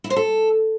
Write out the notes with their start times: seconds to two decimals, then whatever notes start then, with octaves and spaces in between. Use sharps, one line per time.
0.04 E4
0.10 C5
0.16 A4